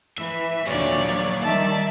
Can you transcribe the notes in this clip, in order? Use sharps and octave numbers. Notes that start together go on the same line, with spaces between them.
E3 B4 E5
D#2 A#2 D3 F3 F#3 C#5 D5
D#3 G3 D5 E5 A5